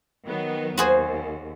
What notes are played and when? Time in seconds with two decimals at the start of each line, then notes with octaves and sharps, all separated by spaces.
0.25 D#3 F#3 B3
0.77 D#2 F#4 G#4 C5